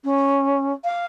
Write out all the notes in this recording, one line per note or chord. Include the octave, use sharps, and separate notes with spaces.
C#4
F5